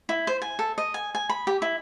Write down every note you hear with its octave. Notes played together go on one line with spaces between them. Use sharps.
E4
C5
G#5
A4
D#5
G#5
G#5
B5
G4
E4